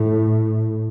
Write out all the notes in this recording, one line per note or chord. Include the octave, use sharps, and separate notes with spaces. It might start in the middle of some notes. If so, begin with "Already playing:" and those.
Already playing: A2